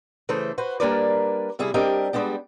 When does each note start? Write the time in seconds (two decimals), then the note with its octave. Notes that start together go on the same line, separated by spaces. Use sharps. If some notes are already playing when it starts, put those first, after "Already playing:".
0.29 C#3 E3 A3 A4 C5
0.58 F#4 B4 C5
0.80 G3 A#3 D4 A#4 B4 D5
1.59 C3 G3 E4 G#4
1.74 G3 C4 D4 G4 A#4 D#5
2.13 G3 G#3 B3 D4 G4